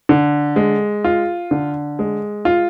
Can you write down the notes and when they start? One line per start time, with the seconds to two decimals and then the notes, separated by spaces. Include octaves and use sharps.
0.09 D3
0.56 G#3
1.04 F4
1.51 D3
1.99 G#3
2.45 F4